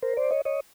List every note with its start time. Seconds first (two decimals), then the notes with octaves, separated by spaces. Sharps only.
0.02 A#4 C5
0.17 C5 D5
0.31 C#5 D#5
0.45 C#5 D#5